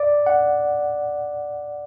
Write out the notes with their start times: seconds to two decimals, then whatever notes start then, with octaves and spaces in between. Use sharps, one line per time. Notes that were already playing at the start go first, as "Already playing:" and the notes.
Already playing: D5
0.26 F#5